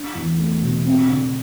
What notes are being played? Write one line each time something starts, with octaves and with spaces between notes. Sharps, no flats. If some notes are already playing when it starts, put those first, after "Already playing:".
Already playing: D4
E2
A3
B2
C4
D3